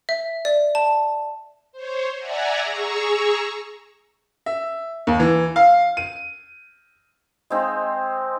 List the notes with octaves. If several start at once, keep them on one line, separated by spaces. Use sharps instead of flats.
E5
D5
A5
C5 C#5
D5 E5 F#5 G#5 A#5
G#4 A#5 C#6 E6
E5
D#2
E3
F5
D#7
G#3 C4 D#4